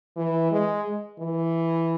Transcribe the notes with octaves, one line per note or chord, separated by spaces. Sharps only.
E3
G#3
E3